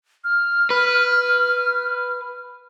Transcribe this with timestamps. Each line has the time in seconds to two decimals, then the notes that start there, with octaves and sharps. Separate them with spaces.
0.24 F6
0.70 B4